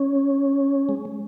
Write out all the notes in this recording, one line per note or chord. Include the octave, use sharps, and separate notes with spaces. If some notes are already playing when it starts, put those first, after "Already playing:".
Already playing: C#4
G#3